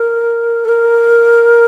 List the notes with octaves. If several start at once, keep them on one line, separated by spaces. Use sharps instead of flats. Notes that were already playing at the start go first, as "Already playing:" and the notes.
Already playing: A#4
A4
A#4